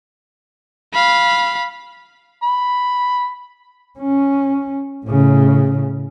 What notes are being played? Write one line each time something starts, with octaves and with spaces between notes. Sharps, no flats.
F5 B5
B5
C#4
A2 C#3